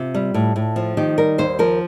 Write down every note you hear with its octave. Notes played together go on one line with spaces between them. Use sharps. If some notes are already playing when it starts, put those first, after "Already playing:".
Already playing: C3 F4
G3
A2
A2
F3
D#3 G4
G3 A#4
D#2 C5
F3 A#4